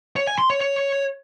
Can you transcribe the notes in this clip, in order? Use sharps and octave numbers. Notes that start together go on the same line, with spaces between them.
C#5
G#5
C6
C#5
C#5